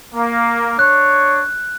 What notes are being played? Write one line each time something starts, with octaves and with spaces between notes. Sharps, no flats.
A#3
D4 C#5 F#6